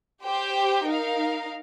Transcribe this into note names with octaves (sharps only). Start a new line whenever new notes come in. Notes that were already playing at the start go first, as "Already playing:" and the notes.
G4 C5 G5
D#4 A#4 F5